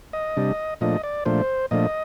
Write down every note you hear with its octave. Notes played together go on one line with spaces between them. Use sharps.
D#5
C3 G3 D4
A#2 F3 A3 D4 D#5
D5
A#2 F3 A3 D4 C5
A#2 F3 A3 D4 D#5